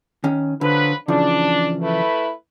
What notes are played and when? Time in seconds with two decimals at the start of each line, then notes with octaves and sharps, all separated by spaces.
0.24 D#3 C#4
0.61 D3 F3 F#3 B4
1.08 C#3 E3 F3 D4
1.82 A3 E4 B4